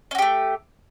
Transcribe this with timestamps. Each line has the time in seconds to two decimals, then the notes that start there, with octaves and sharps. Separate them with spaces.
0.11 C#4
0.15 F#4
0.18 G4
0.22 A3